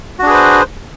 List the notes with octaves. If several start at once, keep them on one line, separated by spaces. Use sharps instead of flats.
D4 F#4 G#4 B4 C5